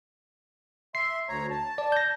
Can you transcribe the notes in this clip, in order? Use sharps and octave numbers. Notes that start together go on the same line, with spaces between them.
E5 C6 C7
D2 C#5 A#5
A5
D5
G6 A#6